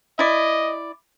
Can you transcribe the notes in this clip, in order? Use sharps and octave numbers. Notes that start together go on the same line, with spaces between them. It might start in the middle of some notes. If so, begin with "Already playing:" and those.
E4 D5 D#5